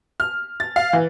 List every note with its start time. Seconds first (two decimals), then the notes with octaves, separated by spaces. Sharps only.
0.20 F6
0.60 A6
0.76 F5
0.93 E3